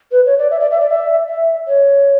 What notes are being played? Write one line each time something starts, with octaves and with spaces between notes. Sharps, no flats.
B4
C#5
D5
E5
D5
E5
D5
E5
E5
C#5